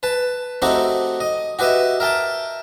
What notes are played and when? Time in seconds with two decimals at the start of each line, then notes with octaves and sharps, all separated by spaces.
0.03 B4 A5
0.62 A3 C4 D#4 F#4 G4
1.20 D#5
1.59 F#4 G4 B4 D#5 E5
2.00 A#4 E5 G5 A5